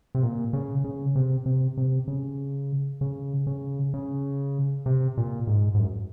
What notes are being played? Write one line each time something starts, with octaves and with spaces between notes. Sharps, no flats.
C3
A#2
C#3
C#3
C3
C3
C3
C#3
C#3
C#3
C#3
C3
A#2
G#2
G#2
F#2